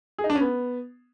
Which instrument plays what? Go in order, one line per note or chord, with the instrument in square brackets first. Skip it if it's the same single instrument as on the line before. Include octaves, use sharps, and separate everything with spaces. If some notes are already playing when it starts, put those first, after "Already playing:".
[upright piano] G#4
D#4
D4
C#4
B3